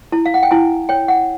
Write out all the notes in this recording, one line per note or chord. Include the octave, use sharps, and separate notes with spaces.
E4 A5
F5
F#5
G5
E4 G#5
C#5 G5
F#5